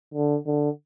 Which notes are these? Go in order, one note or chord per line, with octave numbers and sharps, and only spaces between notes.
D3
D3